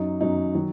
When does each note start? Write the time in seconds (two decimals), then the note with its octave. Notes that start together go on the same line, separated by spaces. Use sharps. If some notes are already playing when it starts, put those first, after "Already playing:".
Already playing: F#2 F#3 D#4
0.21 F#2 F#3 D#4
0.55 D#3 F#3